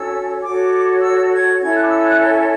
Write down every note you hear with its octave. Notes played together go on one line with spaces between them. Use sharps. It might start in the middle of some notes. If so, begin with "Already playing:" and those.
Already playing: C#4 F#4 A4 C#5 E6
F#4 A4 C#5 D6
E6
G#6
C#4 E4 A4 C#5 G#6
F#6
D6
E6
F#6
G#6